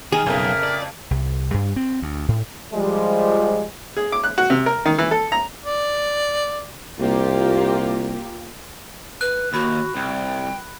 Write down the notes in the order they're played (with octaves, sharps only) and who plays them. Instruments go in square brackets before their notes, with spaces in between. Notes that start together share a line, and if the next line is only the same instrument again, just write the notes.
[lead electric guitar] D#3 [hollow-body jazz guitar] G#4 [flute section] F6
[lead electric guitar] B1 [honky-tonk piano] F2 C#3 [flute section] A#4 E5 F6
[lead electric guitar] D5
[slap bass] C2
G2
C4
D2
A2
[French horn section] F3 G3 G#3
[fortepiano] G#4
D6
F#6
F#4
C3
A#4
D#3
E3
A4
A#5
[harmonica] D5
[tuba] C2 [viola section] A#3 F4 G4
[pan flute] B4 [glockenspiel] F#6
[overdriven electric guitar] D#2 [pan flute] F#4 [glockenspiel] B5
[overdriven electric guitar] C2 [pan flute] G5